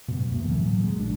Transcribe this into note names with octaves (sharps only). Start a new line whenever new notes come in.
F#2 B2
D2 A#3
A2 D3 E3 F#3
F#3
A#2 G#3
A#1 D4